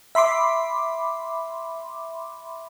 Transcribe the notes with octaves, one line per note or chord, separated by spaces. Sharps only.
E5 B5 C6 D6